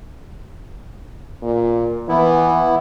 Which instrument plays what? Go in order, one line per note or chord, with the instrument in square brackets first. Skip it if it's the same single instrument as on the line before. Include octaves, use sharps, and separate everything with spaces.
[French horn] A#2
[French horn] E3 [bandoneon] B3 E4